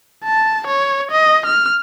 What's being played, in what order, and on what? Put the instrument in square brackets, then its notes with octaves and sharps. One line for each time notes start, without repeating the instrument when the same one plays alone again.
[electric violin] A5
C#5
D#5
F6